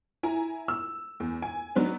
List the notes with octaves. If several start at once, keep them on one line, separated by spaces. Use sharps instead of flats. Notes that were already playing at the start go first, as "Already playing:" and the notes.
E4 G#5 A#5
E6
E2
G#5
F#3 B3 D4 D#4